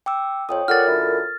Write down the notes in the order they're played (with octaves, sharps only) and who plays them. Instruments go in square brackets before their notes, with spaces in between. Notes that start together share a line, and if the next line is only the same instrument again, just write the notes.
[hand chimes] G5 D6 E6
[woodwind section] F2 [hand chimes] C#5 G5 D#6
[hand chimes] F4 A4 A#4 [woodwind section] C#5 D5 F#5 [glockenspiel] F6 A6
[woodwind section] F#2 D3 E4